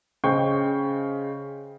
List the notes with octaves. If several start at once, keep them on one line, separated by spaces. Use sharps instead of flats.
C#3 C5 D#5 G5 C#6 G6